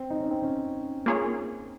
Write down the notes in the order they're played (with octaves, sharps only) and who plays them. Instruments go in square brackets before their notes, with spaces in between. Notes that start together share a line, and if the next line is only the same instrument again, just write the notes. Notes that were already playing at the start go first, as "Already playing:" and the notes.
Already playing: [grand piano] C4
D#4
C#4
C4
C#4
[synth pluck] A#3 F4 G#4 C#5